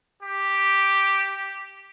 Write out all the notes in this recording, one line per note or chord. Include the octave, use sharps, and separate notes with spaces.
G4